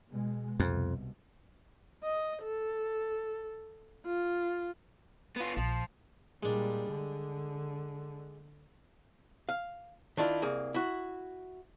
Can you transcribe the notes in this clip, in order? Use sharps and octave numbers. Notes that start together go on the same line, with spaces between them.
B2 G#3
C2 F2 B2
D#5
A4
F4
B3 F4
A#1 F3
A#2 G3 G#3 D4
D3
F5
D#3 D4 E4 F4
C2 A#3 G#4
E4 F#4